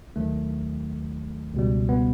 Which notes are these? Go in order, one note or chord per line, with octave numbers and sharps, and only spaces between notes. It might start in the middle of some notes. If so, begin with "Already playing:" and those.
D#2 D#3 F#3 A3
C#2 B2 G3
B3